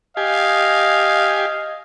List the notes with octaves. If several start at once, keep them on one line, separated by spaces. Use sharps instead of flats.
G4 D#5 F5 G#5